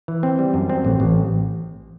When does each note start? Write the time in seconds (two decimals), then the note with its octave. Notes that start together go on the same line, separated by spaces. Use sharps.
0.08 E3
0.23 C4
0.39 G3
0.54 F#2
0.70 C4
0.85 A1
1.00 A1